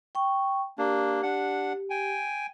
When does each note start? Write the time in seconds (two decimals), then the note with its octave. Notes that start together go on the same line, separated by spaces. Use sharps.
0.15 G5 C#6
0.78 A#3 D4 G4
1.23 D4 F#5
1.90 G5 G#5